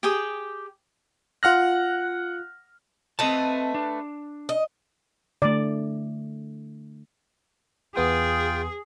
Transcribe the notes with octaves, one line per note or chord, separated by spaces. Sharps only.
G4 G#4 G5 D#6
F4 F#5 F6 F#6 A#6
A3 C4 B4 D#5 A5
D4
D#5
D3 A3 D5
E2 B3 F4 G#4 G5 D#6